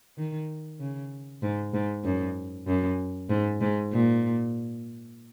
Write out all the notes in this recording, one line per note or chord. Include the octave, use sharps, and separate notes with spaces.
D#3
C#3
G#2
G#2
F#2
F#2
G#2
G#2
A#2